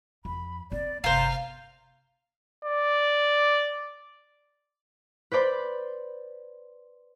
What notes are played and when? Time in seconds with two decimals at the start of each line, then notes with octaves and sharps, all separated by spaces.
0.25 F2 B5
0.72 C4 D5
1.04 G1 C3 F4 C5 F5 A#5
2.65 D5
5.32 B4 C5 D5 B5 C6